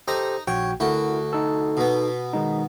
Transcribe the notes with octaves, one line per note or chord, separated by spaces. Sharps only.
D#4 G4 A4 C5 A#5
A#1 F#4 C#5 G5
D2 E4 F#4 A#4 G5
D#4 A4
B2 B3
D#3 G#3 D#4